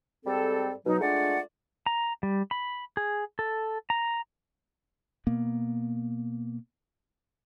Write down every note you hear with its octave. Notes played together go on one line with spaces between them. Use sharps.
G#2 G3 C4 A4
B2 F#3 D#4
G#3 A3 D4 F4 D5 F#5
A#5
G3
B5
G#4
A4
A#5
B2 A#3 B3